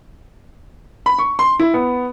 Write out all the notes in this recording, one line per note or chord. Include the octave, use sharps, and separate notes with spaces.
B5
C#6
C6
E4
B3